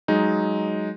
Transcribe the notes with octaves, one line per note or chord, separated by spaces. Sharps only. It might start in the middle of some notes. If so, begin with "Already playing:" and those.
F#3 G#3 D#4